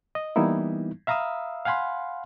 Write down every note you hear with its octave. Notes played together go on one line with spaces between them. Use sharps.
D#5
E3 G3 A#3 B3 D#4 E4
E5 F5 A#5 B5 D#6 E6
F5 F#5 G#5 B5 C6